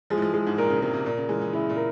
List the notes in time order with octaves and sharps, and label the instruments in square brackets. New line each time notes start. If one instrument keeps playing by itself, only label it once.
[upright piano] F3 [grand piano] G#3
[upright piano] E3
F3
[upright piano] E3 [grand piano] G#3
[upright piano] G#2
[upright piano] A#2 [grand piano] A#4
[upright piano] C#3
[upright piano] C3 [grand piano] A#4
[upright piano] C3
[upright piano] A#2 [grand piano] A#4
[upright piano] C#3
[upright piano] E3 [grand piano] G#3
[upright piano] E3
[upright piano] C#3 [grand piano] E4
[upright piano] A#2
[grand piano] A#4